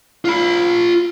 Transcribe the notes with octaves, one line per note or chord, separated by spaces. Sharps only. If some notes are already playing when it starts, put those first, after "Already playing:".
F4 B5